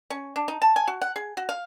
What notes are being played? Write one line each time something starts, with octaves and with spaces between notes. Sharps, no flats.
C#4
D4
D#4
A5
G#5
F#4
F#5
G#4
F#4
F5